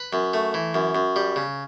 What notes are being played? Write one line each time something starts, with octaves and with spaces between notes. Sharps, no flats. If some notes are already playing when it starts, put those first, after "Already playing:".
Already playing: B4
F#2
A3
E3
F#2
F#2
G3
C#3